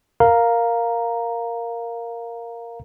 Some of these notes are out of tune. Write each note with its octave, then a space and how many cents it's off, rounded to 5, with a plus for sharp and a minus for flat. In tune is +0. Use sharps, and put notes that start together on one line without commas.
A#4 +0 F5 +0 A#5 +0